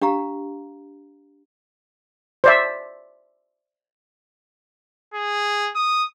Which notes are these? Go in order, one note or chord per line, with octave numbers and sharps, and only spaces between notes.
D4 G4 F5 A#5
C5 D5 E5
G#4
D#6